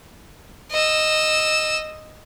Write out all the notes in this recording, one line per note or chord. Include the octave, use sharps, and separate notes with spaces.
D#5 E6